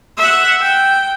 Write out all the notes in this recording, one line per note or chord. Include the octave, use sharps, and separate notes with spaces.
E5 F#5
G5